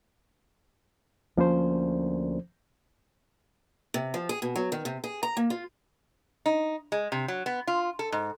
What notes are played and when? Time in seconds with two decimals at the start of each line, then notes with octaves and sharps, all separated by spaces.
1.37 D2 F3 A#3 C#4 C5
3.94 C3
4.14 F3
4.29 G#4
4.42 B2
4.56 F#3
4.72 D#3
4.85 C3
5.04 G#4
5.23 A#5
5.37 A#3
5.50 F4
6.46 D#4
6.92 G#3
7.12 C3
7.28 F#3
7.46 B3
7.67 F4
7.99 A4
8.12 G#2